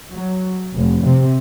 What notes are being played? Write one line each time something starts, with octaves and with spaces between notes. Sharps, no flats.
F#3
F1
C3